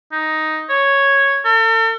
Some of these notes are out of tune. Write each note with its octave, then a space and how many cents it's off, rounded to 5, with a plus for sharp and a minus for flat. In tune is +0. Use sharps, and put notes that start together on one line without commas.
D#4 +5
C#5 -5
A4 +45